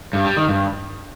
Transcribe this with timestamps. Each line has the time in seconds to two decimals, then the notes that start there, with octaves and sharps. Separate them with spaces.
0.13 G2
0.25 G3
0.37 D#3
0.48 G2